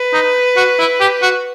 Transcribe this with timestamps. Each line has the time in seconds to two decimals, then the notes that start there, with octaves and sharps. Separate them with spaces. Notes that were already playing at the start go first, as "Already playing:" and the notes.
Already playing: B4
0.13 D#4
0.57 F#4
0.79 E4
1.00 G4
1.22 F#4